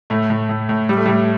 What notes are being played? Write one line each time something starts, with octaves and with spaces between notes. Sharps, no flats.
A2 A3
A2
A2
A2
A2 G3
A3
A2 G3